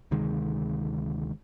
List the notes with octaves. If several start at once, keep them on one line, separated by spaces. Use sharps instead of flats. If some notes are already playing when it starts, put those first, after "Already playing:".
D2 C3 D#3 G#3